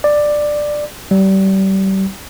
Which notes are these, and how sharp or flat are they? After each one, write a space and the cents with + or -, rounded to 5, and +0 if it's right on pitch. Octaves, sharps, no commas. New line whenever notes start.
D5 +10
G3 -30